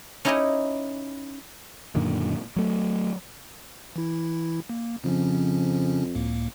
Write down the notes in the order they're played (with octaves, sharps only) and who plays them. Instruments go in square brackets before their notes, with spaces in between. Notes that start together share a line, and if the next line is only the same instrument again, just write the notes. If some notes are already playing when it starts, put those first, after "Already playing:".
[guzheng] C#4 D#4 E4 G4 C#5 D#5
[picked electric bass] F#2 A#2 D3 D#3
F#3 A3
[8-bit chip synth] E3 E4
A#3
[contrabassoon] F2 [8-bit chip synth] C#3 F3 C#4
[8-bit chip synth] C#2 A2 A#3